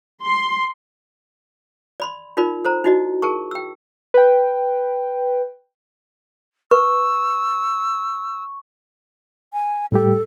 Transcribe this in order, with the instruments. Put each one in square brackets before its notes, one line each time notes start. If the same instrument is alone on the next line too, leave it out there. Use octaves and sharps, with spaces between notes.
[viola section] C6
[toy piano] D5 B5 C6
D#4 F4 A#4 D5 B5
A4 C5 A#5
D#4 E4 F#4 D5 D#5
G#4 A#4 A5 C#6
G5 E6
[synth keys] B4 G5
[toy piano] B4 [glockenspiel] C#6 [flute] E6
[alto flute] G#5
[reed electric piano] A2 G3 G4 [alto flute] A4